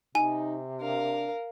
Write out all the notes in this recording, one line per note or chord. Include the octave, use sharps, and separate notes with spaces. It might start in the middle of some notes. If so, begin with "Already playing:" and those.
C3 D#4 G#5
D4 A#4 F5